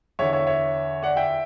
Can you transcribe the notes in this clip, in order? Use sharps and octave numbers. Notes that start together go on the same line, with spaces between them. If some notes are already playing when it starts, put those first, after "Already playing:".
E2 D3 C#5 E5
C#5 E5
C#5 E5
D5 F#5
E5 G5